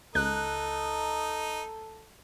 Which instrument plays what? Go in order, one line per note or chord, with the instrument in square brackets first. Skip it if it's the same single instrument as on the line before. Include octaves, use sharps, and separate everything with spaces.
[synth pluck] C#2 F#6 [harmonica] D#4 [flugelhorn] A4